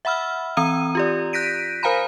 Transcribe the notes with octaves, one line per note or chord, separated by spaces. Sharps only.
E5 F#5 B5 E6 F6
E3 C4 A#5 D#6 E6 D#7
F4 G4 D5
F#6 G6 A#6 B6 D7 D#7
A#4 C5 F5 G#5 A#5 B5